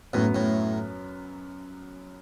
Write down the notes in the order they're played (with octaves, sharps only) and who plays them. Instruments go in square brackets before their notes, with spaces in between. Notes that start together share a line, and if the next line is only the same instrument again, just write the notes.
[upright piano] F#2 F#3 B3 [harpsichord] A2
[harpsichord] A2